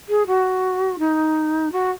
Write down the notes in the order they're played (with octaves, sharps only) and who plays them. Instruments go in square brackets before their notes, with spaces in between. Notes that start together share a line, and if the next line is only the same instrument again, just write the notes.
[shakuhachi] G#4
F#4
D#4
F#4